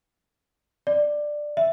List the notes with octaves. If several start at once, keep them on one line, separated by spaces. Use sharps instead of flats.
D5
E5